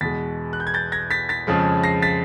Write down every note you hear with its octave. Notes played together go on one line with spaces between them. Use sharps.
E2 B2 G#3 A6 B6
F#6
G6
G#6
G6 A6
G#6 A#6
A6 B6
A6 B6
F2 C#3 F3 G#3
A#6 C7
A6 B6